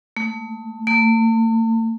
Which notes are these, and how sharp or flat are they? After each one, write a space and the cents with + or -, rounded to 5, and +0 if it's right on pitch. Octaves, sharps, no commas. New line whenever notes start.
A3 +15
A3 +45